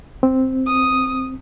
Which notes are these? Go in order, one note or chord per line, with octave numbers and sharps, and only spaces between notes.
C4
D#6